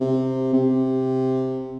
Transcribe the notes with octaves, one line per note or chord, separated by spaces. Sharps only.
C3
C3